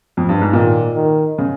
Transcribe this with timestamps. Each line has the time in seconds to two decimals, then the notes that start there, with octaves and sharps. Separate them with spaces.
0.17 F2
0.29 G2
0.41 G#2
0.53 A#2 D#3
0.95 D#3
1.38 C#3